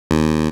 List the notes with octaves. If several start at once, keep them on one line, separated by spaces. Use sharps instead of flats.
D#2